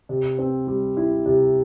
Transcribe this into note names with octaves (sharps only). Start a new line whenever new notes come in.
C3
C4
G3
E4
C3